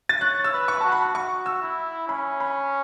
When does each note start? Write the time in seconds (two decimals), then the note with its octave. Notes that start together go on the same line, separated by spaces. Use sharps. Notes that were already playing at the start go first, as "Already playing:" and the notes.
0.09 A6
0.21 C#5 F#6
0.44 E6
0.53 B4
0.68 C#6
0.81 F#4 A5
0.92 B5
1.15 F#4 C#6
1.46 E6
1.62 E4
2.08 C#4 B5
2.40 B5